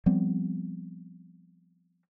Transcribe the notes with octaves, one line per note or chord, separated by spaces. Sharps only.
F3 G3 B3 C4